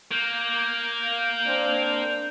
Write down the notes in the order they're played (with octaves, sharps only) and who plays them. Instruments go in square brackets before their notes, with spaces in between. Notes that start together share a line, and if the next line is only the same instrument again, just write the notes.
[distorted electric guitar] A#3 [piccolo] G6
[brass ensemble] C4 D4